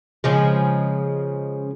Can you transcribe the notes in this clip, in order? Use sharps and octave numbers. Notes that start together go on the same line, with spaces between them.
C#3 F3 G#3